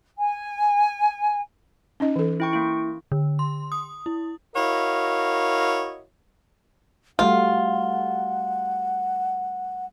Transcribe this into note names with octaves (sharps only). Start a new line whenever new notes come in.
G#5
C#4 D#4 D#5
E3 A4
E4 G5 C#6
A#3 E4
D3
C6
D#6
E4
E4 F#4 A#4 C#5 D#5 F5
G3 A3 F4 F#4 F#5